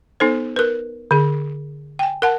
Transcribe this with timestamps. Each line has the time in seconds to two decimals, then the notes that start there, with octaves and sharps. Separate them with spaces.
0.20 B3 D#4 A4 C5
0.56 A#4 B4
1.11 D3 G#4
1.99 G5 G#5
2.22 A#4 F#5 A5